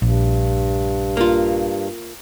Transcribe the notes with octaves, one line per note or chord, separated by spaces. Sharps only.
A#1 G2
A#3 F4